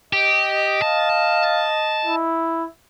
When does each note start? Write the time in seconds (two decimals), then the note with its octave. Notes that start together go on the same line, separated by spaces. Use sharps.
0.13 G4 D#5
0.82 F5 A5
2.05 E4